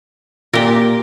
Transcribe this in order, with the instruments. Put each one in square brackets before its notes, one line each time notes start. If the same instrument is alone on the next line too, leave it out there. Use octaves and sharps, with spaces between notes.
[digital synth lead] A#2 [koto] G4 A#4